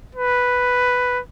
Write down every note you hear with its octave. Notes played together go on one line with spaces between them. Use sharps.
B4